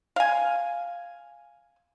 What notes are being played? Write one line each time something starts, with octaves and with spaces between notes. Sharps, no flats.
F5 G#5